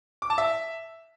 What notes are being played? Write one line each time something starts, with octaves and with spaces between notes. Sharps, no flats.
D6
A5
E5